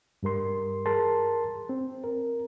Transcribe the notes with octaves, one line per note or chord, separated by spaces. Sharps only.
G2 G3 A#4 C6
G#4 A#4 A5 C6
C4
A#4